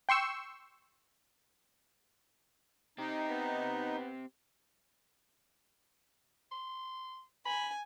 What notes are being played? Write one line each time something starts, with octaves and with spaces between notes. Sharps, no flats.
G5 C6 C#6 E6
C4 D#4 G4
B3
C6
G#5 B5